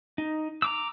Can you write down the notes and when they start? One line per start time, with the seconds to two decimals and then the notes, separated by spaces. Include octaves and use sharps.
0.18 D#4
0.62 A#5 D6 E6